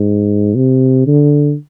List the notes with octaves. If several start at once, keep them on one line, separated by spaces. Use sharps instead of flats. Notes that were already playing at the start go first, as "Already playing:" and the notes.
Already playing: G#2
C3
D3